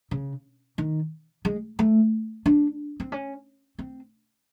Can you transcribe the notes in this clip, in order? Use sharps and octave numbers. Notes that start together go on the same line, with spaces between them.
C#3
D#3
G#3
A3
D4
C4
C#4
C4